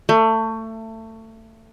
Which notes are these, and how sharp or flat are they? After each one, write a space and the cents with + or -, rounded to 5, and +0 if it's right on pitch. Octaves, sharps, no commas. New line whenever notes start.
A3 +25